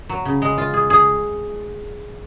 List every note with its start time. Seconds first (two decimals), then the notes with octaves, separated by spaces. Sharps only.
0.09 F#3
0.25 C#3
0.42 G#3
0.58 F4
0.74 G#4
0.90 G#4